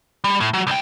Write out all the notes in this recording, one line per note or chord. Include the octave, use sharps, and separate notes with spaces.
G3
A2
F#3
C2 G5